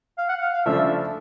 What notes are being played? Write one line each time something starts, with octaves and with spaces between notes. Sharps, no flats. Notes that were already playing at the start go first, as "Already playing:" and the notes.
F5
F#5
F5
F5
C#3 F3 A3 D4 E5